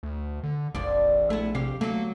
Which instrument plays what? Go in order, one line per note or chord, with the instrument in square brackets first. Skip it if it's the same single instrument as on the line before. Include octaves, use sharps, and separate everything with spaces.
[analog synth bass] D2
D3
[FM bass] F1 [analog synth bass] A#1 [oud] F2 F3 D5
[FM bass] A3 [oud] B3 E4
[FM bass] C3 [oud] G4 F5
[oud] D2 F#3 [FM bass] A3 [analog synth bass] A#3